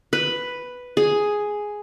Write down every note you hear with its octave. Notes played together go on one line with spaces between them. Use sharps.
B4
G#4